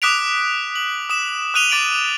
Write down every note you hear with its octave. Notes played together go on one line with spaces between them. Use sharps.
D6 D#6 F#6 B6 D7 F7
F#7
D#6 E7
D#6 F#6 D#7 F7 G7
D6 A6 D7 D#7 F#7